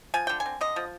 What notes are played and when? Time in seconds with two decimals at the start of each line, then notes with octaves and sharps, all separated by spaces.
0.14 F3 G#5
0.27 D3 G5
0.40 G#5
0.46 C4
0.61 D3 D#5
0.76 F3